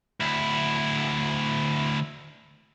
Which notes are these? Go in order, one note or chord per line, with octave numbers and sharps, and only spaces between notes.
D2 E4